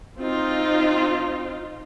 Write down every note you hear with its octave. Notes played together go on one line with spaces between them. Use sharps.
C4 D#4 F4